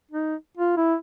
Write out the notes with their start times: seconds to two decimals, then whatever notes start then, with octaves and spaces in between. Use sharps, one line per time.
0.12 D#4
0.57 F4
0.77 E4